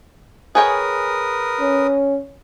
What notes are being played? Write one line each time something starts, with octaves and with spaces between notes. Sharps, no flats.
G#4 A#4 B4 C#5 G5 D#6
C#4